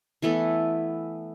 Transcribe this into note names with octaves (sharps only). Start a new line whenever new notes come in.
E3 A3 B3 A4